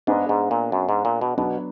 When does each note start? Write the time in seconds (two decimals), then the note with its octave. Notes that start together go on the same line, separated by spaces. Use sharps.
0.07 G#2 B3 D4 G#4 B4 D#5
0.29 G#2
0.51 A#2
0.72 F#2
0.89 G#2
1.05 A#2
1.21 B2
1.37 B2 F#3 B3 D4